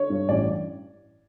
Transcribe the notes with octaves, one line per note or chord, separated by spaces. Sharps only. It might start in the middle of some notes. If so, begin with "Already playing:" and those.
Already playing: D3 C#5
G2
A1 D5